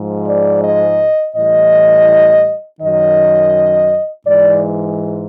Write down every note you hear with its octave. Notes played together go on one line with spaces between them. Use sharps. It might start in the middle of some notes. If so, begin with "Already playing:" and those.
Already playing: G#2 F3 G#3
D5
D#5
A2 E3 G3 D#5
F#2 D#3 F#3 D#5
G#2 E3 G#3 D5